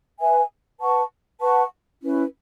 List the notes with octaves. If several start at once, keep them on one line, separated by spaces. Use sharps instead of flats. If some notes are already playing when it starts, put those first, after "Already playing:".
B4 E5 G#5
B4 F#5 A5 C#6
B4 F#5 A5 C#6
C#4 E4 B4